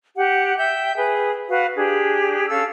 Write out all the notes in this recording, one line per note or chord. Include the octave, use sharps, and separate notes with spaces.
G4 F#5
E5 G5 G6
G#4 B4
F#4 B4 F5 F#5
D4 G4 G#4
C#4 A4 F5 E6